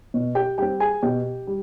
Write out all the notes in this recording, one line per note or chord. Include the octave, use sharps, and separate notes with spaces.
B2
G4 G5
G3 C4 G4 G5
G#4 G#5
B2 G4 G5
G3